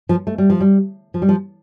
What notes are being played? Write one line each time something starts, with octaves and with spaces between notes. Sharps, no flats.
F3
A3
G3
F3
G3
F3
G3
F3